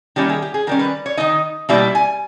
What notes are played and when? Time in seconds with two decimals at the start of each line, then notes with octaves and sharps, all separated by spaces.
0.16 D#3 G3 A#3 C#4 E4 G4
0.29 G#4
0.42 G4
0.54 G#4
0.67 D#3 G3 C#4 A#4
0.79 B4
1.06 C#5
1.17 D#3 G#3 D#4 D#5
1.69 B2 G3 A#3 E4 E5
1.95 G#5